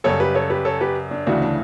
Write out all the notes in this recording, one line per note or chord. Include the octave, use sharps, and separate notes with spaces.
F#2 C#3 G3 A4 C#5
G4 B4
A4 C#5
G4 B4
A4 C#5
G4 B4
D4
D2 C#3 E3 D4 F#4
D4